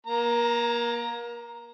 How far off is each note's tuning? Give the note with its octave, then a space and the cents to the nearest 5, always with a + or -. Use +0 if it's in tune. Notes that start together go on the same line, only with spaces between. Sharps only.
A#3 +30 A#5 +0